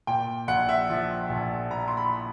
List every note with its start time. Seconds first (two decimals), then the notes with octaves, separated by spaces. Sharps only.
0.07 A#2 G5
0.48 A#1 F#5
0.69 E5
0.90 F3
1.29 A#1
1.70 A#2 A#5
1.88 C6
1.97 B5